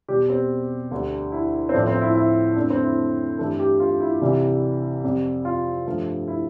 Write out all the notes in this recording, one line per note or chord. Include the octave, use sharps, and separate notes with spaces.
E2 B2 G3 G4
C4
D2 D3 G3
E4
C4
A2 F3 A3 D4
C4
E4
E4
F2 D3 A3 D4
C4
E4
G2 E3 A3 A4
G4
F4
E4
C2 C3 E3 G3
F2 C3 G3
F4
G2 F3 A3
E4